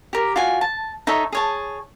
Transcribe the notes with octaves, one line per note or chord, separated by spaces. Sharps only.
G4 A#4
F4 F#4 G#5
A5
D#4 A4 C#5 E5
G#4 C#5 A5